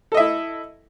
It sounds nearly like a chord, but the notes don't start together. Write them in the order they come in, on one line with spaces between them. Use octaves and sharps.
A4 D#5 E5 E4